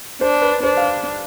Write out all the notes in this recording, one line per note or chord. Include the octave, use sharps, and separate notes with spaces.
D4 C5
B4
D4 C5
F5